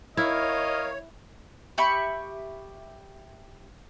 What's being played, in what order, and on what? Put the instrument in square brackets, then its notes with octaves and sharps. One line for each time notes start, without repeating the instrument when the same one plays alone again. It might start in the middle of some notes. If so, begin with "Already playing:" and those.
[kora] E4 [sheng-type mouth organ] A#4 F5 [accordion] C#5 [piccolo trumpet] D#5
[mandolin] G4 E5 B5 C#6